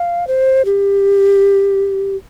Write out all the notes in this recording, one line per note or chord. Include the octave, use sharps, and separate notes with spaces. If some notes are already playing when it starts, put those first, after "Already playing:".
Already playing: F5
C5
G4